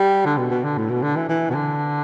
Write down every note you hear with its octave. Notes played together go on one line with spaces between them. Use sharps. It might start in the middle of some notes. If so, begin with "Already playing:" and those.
Already playing: G3
D3
B2
B2
D3
A2
B2
D3
E3
E3
B2
D3